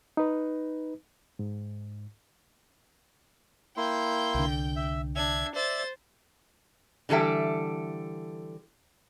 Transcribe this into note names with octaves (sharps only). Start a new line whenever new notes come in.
D#4 B4
G#2
A#3 E4 G5 C6 G6
C2 D3
E5
D4 E5 G#6
C5 D5 E5 A6
D3 E3 G3 A4 E5